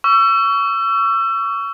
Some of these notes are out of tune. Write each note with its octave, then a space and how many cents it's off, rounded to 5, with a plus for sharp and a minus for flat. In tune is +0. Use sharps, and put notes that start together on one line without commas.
C#6 +25 E6 +35